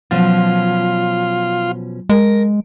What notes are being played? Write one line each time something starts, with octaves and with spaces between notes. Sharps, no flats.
B2 F3 F#3 C#4 F4
G#3 A#4